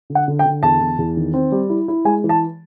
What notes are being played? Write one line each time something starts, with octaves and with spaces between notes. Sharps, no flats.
D3
F#5
D3
G5
D3
E2 A5
E2
E2
D#3
C4
G3
E4
E4
G#3 G#5
E3
A5